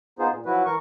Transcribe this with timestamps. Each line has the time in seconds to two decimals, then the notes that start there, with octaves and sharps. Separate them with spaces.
0.19 B3 D#4 F4 G#4 C5
0.31 A#2
0.46 F3 F#3 E4 F#4 B4
0.65 E3 A#4 C#6